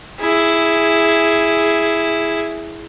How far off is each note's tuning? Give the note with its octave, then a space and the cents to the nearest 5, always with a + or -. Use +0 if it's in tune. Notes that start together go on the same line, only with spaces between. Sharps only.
E4 +0 G#4 +0